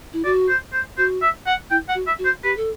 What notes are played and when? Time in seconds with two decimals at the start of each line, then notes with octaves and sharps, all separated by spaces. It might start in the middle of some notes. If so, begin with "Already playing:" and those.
0.13 E4
0.24 F#4 D5
0.49 C5
0.73 C5
0.98 F#4 C5
1.22 E5
1.46 F#5
1.70 E4 G5
1.88 F#5
1.95 F#4
2.07 E5
2.19 F#4
2.24 C5
2.43 G4 B4
2.57 A4